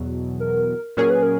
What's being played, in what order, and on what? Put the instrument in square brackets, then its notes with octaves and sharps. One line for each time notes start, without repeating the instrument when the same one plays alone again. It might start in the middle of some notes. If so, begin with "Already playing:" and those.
Already playing: [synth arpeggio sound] E2 B2 F#3
[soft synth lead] A#4
[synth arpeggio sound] A#2 F#3 C#4 G#4 [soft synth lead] A#4
[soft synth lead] B4
A#4